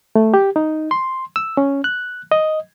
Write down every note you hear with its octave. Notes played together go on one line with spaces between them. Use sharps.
A3
G4
D#4
C6
E6
C#4
F#6
D#5